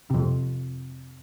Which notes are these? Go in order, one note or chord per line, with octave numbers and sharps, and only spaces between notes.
F2 C3